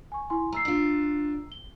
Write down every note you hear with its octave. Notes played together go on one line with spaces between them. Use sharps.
G#5 C#6
E4 G#5 C6
A3 A#5 E6 C7
D4 F4
G7